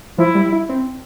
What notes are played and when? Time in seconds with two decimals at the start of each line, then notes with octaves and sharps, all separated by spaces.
0.18 F3 E4
0.35 G3
0.52 E4
0.69 C4